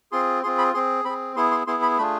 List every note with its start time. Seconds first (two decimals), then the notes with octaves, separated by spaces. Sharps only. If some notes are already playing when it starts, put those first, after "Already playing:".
0.12 C4 F4 G#4 C6
0.43 C4 F4 G#4 C6
0.58 B5
0.74 C4 G#4 C6
1.05 C4 B5
1.09 G#4
1.36 B3 E4 G#4 C6
1.51 C6
1.67 B3 E4 G#4 C6
1.82 B5
1.98 A3 D4 F4 G#4 B5